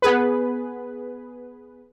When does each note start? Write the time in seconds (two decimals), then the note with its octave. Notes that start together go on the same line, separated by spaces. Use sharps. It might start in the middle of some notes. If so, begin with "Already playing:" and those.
0.02 B3 G#4 B4